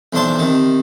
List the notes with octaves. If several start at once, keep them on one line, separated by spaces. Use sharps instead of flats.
B1 E2 D4 C5 A5
C3 D#3